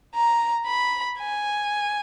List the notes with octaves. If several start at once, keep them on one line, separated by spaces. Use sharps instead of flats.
A#5
B5
G#5